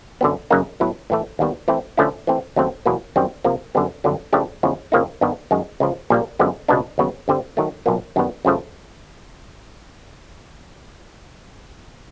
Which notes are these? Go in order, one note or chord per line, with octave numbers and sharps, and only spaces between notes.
F#2 D3 F#3 B3
F#2 C#3 F#3 A#3 D#4
A2 F#3 B3 E4
A2 E3 A3
D#2 D#3 G3 B3
E3 A3 C4 E4
D3 F3 A3 C#4 E4
E3 A3 C4
D#2 C#3 F#3 A3 C4
E2 B2 F#3 A#3
F#2 D#3 G3 C4
C3 F3 A#3
F#2 D3 G3 B3
G1 F2 D3 F#3
C#3 F3 A3 D4 G4
E2 C#3 F3 G#3
F2 C#3 F3 A#3 D#4
G2 D#3 G3 B3
F#2 D#3 G#3
C#2 C#3 F3
A#1 A#2 G3 A#3
F#2 D3 F3 G#3 B3
C#2 B2 G#3 B3 D4
D#2 C#3 F#3 B3
G2 D3 G3 C4
D#3 F#3 A3
B1 A#2 F#3 A#3
F#2 D#3 G3 B3
F#2 C#3 F3 A3